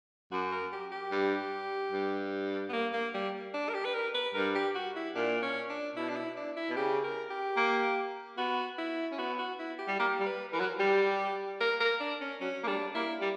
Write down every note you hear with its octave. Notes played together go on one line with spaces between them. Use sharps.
F#2 F#4
A#4
G4
G4
G2
G2
B3
A#3
A#3
G3
D4
A#4
G4
B4
A#4
B4
G2 A#4
G4
F#4
E4
A#2 D4
C#4
D4
B2 E4
D4
E4
D4
E4
B2
C#3 G4
A#4
G4
A#3
B3 F#4
E4
C#4
B3 F#4
F#4
E4
G4
G3
A#3 G4
G3
B4
E3 A#4
F#3
G3 G4
A#4
A#4
D4
C#4
F#3 C#4
A#3
G3 D4
A#3 E4
G3